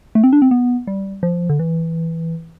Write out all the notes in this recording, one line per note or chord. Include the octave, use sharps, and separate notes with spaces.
A3
C4
D4
C4
B3
G3
F3
D3
E3